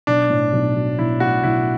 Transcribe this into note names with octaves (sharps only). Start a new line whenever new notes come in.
B1 D4
A2
B1
F#3
B1 E4
A2 F#4
B1 E4